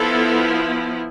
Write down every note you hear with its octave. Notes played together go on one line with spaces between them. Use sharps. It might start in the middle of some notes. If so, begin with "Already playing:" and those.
Already playing: F3 B3 E4 A4